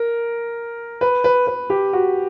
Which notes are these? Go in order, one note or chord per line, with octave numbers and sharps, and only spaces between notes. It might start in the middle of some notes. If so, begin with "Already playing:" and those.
Already playing: A#4
B4
B4
B4
G4
F#4